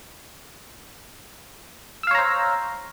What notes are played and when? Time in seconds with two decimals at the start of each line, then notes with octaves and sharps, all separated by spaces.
2.03 E6
2.07 F5
2.11 C#5
2.15 A#5
2.18 C5